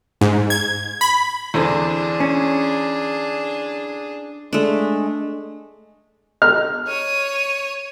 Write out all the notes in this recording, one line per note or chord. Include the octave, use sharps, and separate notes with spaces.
G#2
G#6
B5
E2 D3 C4 D4 G#4
C#4
G#3 A3 D4
D#5 F6
C#5 D#7